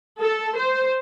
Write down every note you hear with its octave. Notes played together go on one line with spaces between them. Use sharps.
A4
C5